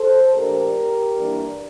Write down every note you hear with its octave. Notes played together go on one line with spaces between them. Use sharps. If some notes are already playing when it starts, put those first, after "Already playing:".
Already playing: A4 C5
A#2 F3 A3 D4 G4 A#4
G2 E3 A#3 D4